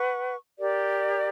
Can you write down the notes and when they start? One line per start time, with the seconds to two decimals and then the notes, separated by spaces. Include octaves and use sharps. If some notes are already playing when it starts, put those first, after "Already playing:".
Already playing: B4 F#5 C#6
0.59 G4 A#4 D5